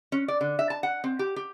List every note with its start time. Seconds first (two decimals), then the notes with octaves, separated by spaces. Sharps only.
0.12 C#4
0.28 D5
0.41 D3
0.59 E5
0.70 A5
0.83 F#5
1.04 C4
1.19 G4
1.36 G4